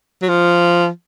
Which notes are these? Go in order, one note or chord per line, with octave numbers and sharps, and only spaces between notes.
F#3
F3